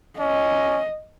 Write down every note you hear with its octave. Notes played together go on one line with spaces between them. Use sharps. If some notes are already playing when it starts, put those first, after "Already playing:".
C#4 D#5